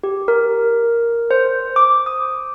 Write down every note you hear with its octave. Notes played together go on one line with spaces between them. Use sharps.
G4
A#4
C5
D6
D#6